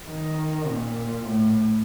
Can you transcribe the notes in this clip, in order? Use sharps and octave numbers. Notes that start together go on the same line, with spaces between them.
D#3
A#2
A2